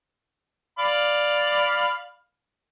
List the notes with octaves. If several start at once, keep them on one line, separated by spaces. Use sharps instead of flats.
D5 F5 B5